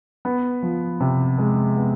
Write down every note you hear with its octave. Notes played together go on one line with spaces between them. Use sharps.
B3
F3
C3
G#3
B3